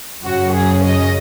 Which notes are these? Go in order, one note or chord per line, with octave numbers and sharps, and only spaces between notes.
F#2 C#3 F#3 C#4 F#4
G#4
D#5